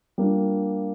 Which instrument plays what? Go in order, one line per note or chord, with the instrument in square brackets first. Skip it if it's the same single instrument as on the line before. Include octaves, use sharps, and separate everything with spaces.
[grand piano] G3 A#3 D4 F4